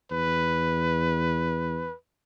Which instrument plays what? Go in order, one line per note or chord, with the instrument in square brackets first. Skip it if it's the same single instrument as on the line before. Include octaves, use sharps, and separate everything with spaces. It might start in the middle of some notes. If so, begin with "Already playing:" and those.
[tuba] E2 [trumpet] B4